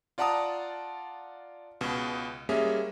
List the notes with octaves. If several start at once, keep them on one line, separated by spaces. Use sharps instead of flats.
F4 D5 F#5 A5 A#5 D#6
C#2 B2
G3 G#3 A#3 C#4 G#4 E5